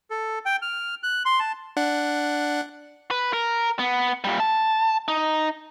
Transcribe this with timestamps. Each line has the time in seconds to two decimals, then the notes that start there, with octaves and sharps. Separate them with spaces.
0.10 A4
0.46 G5
0.62 F6
1.03 F#6
1.25 C6
1.40 A5
1.77 D4 F#5
3.11 B4
3.33 A#4
3.79 B3
4.24 A#2 G3
4.40 A5
5.08 D#4